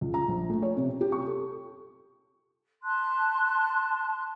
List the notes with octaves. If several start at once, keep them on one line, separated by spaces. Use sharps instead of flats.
C#2
A#5
A#1
A3
C#5
C3
C3
G4
C#6
A4
A5 C6 F#6